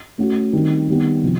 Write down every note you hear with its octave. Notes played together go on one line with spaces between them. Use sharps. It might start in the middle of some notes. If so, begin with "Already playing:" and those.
A3 C#4 F#4
D#3 G3 C4
D#3 G3 B3
C3 F3